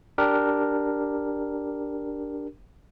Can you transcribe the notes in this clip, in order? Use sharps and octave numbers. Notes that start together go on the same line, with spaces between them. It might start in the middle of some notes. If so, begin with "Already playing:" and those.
D4 G4 A#4